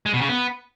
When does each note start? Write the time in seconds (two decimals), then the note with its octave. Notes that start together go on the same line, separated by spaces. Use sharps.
0.06 G#3
0.14 B2
0.21 C#3
0.29 B3